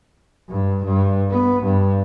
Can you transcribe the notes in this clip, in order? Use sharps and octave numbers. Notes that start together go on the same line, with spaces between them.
G2
G2
B3
G2